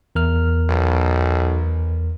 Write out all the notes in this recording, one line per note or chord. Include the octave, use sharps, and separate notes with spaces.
E2 A#4 F6
B1